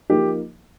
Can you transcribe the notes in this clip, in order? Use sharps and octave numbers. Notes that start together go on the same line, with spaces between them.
F3 A#3 D#4 G4